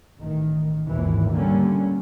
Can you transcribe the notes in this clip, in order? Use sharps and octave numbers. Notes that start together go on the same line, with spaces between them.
A1 D#3
G#1 D#2 A#2 E3
D3 G3 A#3 C#4